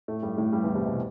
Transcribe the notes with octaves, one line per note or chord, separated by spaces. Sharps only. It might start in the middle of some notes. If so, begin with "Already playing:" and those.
A2 A3
G2 G3
A2 A3
G2 G3
E2 E3
C2 C3
B2